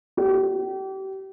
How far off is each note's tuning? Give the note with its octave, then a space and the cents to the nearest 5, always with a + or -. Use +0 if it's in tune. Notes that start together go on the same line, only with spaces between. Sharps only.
G4 -35